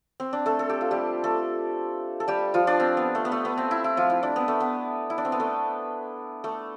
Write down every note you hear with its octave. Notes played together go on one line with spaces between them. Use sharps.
C4
D4
A3 A4
A4
G4
F4
G3 G4
A3 A4
A4
G3 G4
F3 F4
D4
C4
B3
A3
B3
A3
B3
C4
E4
E4
F3 F4
E4
D4
B3
A3
B3
E4
D4
C4
B3
A3
A3